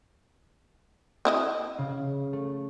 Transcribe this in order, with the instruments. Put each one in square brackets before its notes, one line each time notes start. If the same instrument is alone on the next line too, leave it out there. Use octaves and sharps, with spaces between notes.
[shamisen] C4 E4 D#5
[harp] C#3
A3